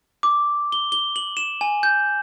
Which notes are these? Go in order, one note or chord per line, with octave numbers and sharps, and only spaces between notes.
D6
G7
G7
F#7
E7
G#5
G6